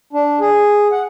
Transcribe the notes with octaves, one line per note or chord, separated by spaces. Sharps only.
D4
G#4
F#5